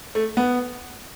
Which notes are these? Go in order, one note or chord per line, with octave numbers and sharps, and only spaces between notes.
A3
B3